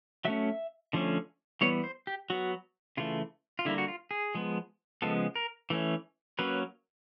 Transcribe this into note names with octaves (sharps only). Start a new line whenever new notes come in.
F#3 A3 C#4 E5
D3 F3 A3 C#4
E3 G3 B3 C#5
C5
G4
F#3 B3 F#4
C#3 E3 A3 F4
F4
D3 G3 A#3 E4
F#4
F4
G#4
F3 G#3 B3
C#3 F3 G#3 B3 A4
A#4
E3 A3 C#4
F#3 A#3 C#4 B4